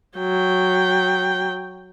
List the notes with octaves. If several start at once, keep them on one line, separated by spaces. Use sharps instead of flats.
F#3 G5